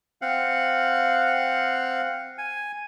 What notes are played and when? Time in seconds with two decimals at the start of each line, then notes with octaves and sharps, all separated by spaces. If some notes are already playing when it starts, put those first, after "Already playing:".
0.22 C4 F5 F#5
2.38 G#5